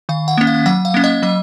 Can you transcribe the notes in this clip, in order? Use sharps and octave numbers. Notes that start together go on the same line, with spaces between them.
D#3 F5
F#5
A#3 C#4
F5
F#3 F#5
F5
A#3 C#4
D#5
F#3 D#5